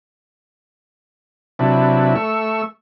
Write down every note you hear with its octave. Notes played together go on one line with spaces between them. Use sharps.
C3 F#3 D4 E4 B4
A3 C#6 E6